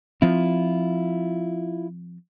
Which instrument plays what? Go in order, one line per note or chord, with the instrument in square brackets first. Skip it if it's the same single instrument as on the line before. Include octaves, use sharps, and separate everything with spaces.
[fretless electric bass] F3 C4 [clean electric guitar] E4 F4